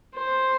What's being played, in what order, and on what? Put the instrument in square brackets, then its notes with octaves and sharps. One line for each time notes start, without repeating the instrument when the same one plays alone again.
[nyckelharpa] C5